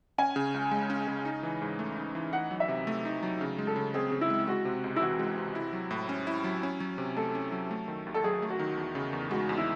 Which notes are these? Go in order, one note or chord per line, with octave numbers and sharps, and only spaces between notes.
C#4 G#5
C#3
C#2
G#3
C#4
C#3
D#4
E3
G#2
A3
D#4
E3
D#4 F#5
F#3
E5
C3
A3
D#4
F#3
C#3
G#3
A4
C#3
C4 G#4
C#3
E4
G#3
G#3 F#4
C3
C#2
E4
E3 F#4
G#3
C3
E4
F#3
A2
C#4
E4
F#3
C#4
F#3
C3
A3 A4
C#4
F#3
A3
D#3
D#2
A4
F#3 G#4
A3
F#4
D#3
E2
C#3
E2
G#3 F#4
E2
E4